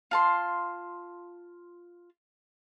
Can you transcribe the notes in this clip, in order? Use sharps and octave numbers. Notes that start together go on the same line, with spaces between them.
F4 A5 C6